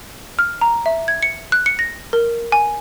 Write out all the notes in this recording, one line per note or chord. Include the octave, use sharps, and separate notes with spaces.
F6
A#5
E5
G#6
C#7
F#6
C#7
A#6
A#4
G#5